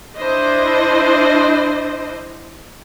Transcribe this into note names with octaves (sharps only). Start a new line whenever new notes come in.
D4 E4 C5 D#5